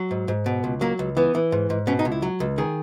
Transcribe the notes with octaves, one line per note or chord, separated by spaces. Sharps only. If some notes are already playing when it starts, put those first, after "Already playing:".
Already playing: F#3
G#2
G#2
B2
C#2
F#3 A#3
C#2
E3 B3
E3
G#2
G#2
B2 C#4
D#4
C#2
E4
F#3
C#2
D#3 G#4